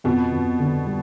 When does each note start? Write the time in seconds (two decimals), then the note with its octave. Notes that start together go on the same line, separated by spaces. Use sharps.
0.04 F2 B2
0.32 F2
0.59 D3
0.86 G3